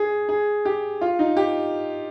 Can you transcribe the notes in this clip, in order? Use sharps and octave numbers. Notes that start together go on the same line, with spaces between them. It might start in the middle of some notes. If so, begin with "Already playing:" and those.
Already playing: G#4
G#4
G4
F4
D#4
G4